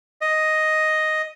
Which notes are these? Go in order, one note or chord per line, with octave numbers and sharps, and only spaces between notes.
D#5